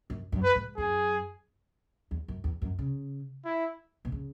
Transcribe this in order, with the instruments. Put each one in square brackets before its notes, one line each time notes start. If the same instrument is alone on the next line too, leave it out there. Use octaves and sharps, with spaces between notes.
[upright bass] F#2
F#2
[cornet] B4
[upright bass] G#2
[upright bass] F#2 [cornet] G#4
[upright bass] E2
F#2
E2
F#2
C#3
[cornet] E4
[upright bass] B2
C#3